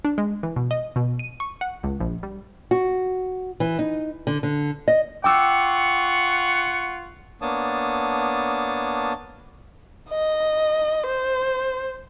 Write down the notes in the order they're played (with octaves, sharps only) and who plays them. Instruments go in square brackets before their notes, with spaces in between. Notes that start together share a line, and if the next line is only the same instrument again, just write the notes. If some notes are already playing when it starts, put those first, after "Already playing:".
[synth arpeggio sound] D4
G#3
E3
B2
D#5
B2
D#7
C#6
F#5
C#2
A#1
G3
[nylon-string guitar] F#4
E3
D#4
D3
D3
D#5
[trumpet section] F4 F#5 C#6 [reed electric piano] G5 D6 E6
[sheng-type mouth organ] A#3 B3 D4 C#5 A5 D#6
[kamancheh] D#5
C5